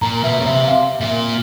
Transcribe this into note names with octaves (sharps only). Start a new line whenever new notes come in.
A#2 A#5
B2 E5
C#3
C3 E5
E5
F5
A#2 E5